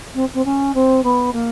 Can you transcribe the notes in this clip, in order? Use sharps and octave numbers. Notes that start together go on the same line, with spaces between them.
C4
C4
C#4
C4
B3
A#3